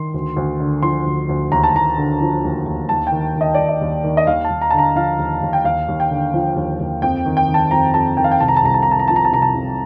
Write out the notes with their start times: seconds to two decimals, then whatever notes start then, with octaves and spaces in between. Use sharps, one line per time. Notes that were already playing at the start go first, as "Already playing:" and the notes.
Already playing: D#3 C6
0.14 D2
0.36 D2
0.60 D3
0.82 F3 C6
1.06 D2
1.29 D2
1.51 D#2 A#5
1.63 A5
1.74 D#2 A#5
1.97 D3
2.21 F3
2.44 D#2
2.66 D#2
2.89 D#2 A5
3.07 G5
3.12 D#3
3.36 D#3
3.41 D#5
3.55 D#2 D5
3.69 D#5
3.81 D#2
4.04 D#3
4.17 D#5
4.27 D#2 F5
4.44 A5
4.50 D#2
4.62 A#5
4.71 D3 A5
4.78 A#5
4.96 F3 F5
5.19 D#2
5.42 D#2
5.53 G5
5.64 D#2 F5
5.88 D#2
6.00 G5
6.10 D3
6.34 F3
6.56 D#2
6.80 D#2
7.02 F2 G5
7.26 D#3
7.37 G5
7.49 D#3
7.54 A5
7.71 F2 A#5
7.94 F2 A5
8.17 D#3 G5
8.24 F5
8.32 G5
8.40 C2 A5
8.48 A#5
8.57 A5
8.64 C2 A#5
8.74 A5
8.83 A#5
8.87 C3 A5
8.99 A#5
9.08 F3 A5
9.16 A#5
9.25 A5
9.32 C2 A#5
9.42 A5
9.55 C2